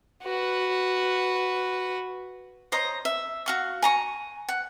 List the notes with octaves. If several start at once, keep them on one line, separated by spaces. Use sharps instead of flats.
F#4 B4
C5 C#5 D#5 A#5
E5
F#4 F5 C#6
G#5 A#5 C#6
F#5